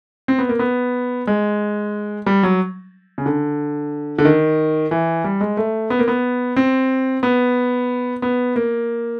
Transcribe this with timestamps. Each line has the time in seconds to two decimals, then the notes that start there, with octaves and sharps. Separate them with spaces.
0.28 C4
0.39 B3
0.49 A#3
0.59 B3
1.27 G#3
2.26 G3
2.43 F#3
3.18 C#3
3.26 D3
4.18 D3
4.25 D#3
4.91 E3
5.24 G3
5.41 G#3
5.57 A3
5.90 B3
5.99 A#3
6.08 B3
6.56 C4
7.23 B3
8.22 B3
8.56 A#3